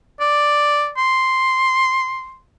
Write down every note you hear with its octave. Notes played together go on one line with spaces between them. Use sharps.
D5
C6